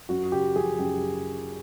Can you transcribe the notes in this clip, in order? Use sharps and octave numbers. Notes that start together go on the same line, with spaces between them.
F#2 F#4
C#3 G4
F3 G#4
F#2 G4